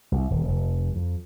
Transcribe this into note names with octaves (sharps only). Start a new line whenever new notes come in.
C2
D#1
F1
F2